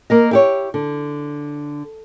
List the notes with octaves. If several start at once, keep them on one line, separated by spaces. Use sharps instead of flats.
A#3 A#4 D#5
E4 G4 C#5
D3